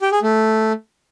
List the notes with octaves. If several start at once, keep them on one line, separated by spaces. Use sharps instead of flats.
G4
G#4
A3